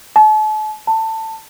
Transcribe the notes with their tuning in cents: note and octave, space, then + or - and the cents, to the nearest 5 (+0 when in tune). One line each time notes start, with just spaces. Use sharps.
A5 -40
A5 +20